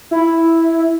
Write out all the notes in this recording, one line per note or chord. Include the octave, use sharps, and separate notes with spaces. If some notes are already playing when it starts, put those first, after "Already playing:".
E4